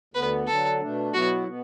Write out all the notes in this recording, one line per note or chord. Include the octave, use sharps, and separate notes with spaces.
D2 D3 B3 B4
D3 F#3 D4 A4
B2 A3 D4
B2 F#3 B3 E4 F#4
B2 B3